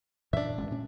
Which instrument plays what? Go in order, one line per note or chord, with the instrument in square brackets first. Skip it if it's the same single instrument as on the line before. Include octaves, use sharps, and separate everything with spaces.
[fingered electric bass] F#2 A#2 E3 [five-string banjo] D4 E5
[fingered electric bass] G1 G#3 C#4
A#2 C#4